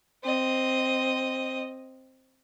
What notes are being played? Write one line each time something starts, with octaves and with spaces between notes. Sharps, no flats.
C4 D#5